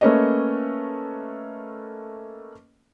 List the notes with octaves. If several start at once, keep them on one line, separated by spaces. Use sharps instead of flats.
A3 A#3 C#4 B4 C#5 D#5